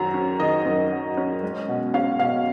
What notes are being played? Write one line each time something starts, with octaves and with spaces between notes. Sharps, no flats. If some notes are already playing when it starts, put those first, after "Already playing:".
Already playing: F#2 D#3 F#3 A#5
C#4
D#3 D#5
F#2
F#3
C#4
G#3
B2
C#4 F5
B2 F5